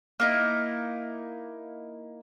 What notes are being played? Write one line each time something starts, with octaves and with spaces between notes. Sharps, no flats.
A#3 D#4 E4